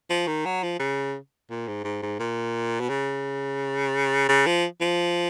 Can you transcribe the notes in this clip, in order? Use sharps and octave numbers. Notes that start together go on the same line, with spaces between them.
F3
D#3
F#3
F3
C#3
A#2
G#2
G#2
G#2
A#2
B2
C#3
C#3
F3
F3